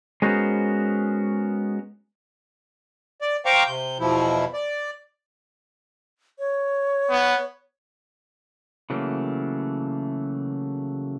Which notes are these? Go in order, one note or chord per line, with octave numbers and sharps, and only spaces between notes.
G#3 B3 C#4 F#4 A#4 C5
D5
C5 F5 G5 A#5 C#6 D6
C3 G6
E2 B2 F3 E4
D5
C#5
B3
C#3 E3 F#3 A3 A#3